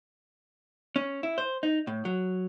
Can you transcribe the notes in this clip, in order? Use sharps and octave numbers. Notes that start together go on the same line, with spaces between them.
C#4
E4
C5
D#4
A2
F#3